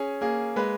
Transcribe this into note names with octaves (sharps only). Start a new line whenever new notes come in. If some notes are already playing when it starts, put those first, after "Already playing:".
Already playing: C#4 G#4
A#3 G#4
G#3 B4